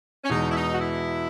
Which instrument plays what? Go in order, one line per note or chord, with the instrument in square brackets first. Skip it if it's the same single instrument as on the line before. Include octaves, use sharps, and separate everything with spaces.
[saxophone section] C#4
[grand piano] E2 B2 G#3 [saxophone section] D#4
[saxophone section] E4
D#4
F#4
E4